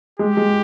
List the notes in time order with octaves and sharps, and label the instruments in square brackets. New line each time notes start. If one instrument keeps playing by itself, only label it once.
[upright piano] G#3 [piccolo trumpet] G4
[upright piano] G#3